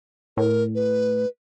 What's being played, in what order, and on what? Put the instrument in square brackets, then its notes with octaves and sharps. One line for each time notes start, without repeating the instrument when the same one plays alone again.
[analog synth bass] A2 [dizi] A#4
[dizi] B4